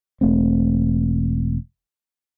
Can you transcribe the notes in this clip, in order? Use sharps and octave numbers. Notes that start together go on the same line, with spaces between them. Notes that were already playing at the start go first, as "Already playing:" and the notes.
E1 A3 C4